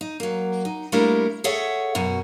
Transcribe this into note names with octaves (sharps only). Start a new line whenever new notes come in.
D#4
F#3 A#3
D#4
G3 A3 A#3 D4 E4 A#4
G#4 A4 C#5 E5 F#5
F#2 B2 C#4 F#4